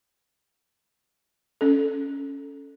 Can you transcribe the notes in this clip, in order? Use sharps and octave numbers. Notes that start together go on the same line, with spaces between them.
C#4 A4